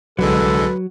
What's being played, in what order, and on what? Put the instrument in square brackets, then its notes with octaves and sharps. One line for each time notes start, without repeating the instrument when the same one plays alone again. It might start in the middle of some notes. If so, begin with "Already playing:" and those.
[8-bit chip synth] C2 D3 G#3 [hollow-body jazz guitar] F#3 [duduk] A4 [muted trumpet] B4